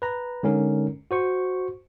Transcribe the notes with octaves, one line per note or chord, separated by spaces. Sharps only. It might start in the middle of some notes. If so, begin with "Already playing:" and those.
B4 A#5
D3 G#3 C#4 D#4 A#4
F#4 C5 C#6